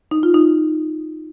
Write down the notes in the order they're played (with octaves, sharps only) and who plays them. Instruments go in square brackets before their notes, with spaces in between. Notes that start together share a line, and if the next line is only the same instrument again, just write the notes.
[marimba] D#4
F4
D#4